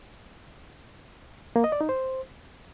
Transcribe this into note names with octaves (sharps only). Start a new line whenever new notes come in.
A#3
D#5
D5
D#4
C5